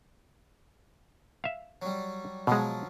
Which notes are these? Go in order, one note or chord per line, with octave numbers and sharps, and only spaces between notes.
E5 F5
F#3 G3
B2 F3 F#3 G#3